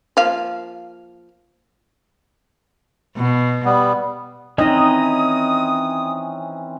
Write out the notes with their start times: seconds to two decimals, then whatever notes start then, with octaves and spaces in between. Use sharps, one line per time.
0.17 F3 A#3 F5
3.17 B2
3.65 G3 B3
4.58 E3 C4 C#4 D#4 D#5 D#6